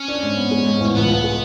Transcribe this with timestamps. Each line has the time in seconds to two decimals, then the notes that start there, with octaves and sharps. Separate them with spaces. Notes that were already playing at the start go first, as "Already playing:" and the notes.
Already playing: C#4
0.08 D4
0.23 G#2
0.37 B3
0.51 G#3
0.66 G#2
0.80 A1
0.94 C#2 B3
1.09 C#2
1.24 G#3